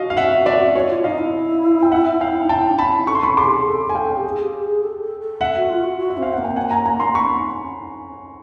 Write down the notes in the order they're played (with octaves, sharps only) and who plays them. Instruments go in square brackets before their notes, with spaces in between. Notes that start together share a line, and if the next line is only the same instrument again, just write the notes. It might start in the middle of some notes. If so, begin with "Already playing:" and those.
Already playing: [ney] F#4 [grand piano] D#5 F5
[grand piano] F5
E5 F#5
D5 E5
[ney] F#4 [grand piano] C#5 D#5
[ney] F4
[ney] D#4 [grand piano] D#5 F5
[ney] E4
[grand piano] G5
E5 F#5
F5 G5
[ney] D#4
[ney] E4 [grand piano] G5 A5
[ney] D4
[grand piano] A5 B5
[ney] E4
[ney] A4 [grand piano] C#6
[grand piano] C6
B5 C#6
[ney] G#4 [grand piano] C6 D6
[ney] G4
G#4
A4
[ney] A4 [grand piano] G#5
[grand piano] F5 G5
[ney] A4
G4
G#4
G4
G#4
A4
A4
A4
[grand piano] E5 F#5
[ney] F#4
F4
F#4
F#4
[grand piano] E5
[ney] C4
[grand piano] F5
[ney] A#3 [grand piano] F#5
[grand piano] G5
F#5 G#5
G#5 A#5
G#5 A#5
A#5 C6
B5 C#6